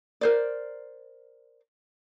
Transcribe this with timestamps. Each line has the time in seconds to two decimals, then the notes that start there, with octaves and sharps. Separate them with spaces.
0.21 A#4 C5 D5